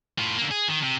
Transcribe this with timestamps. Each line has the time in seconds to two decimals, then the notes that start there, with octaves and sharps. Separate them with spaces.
0.18 A2 F4
0.38 D3 A#3
0.51 G#4
0.68 D#3
0.82 C3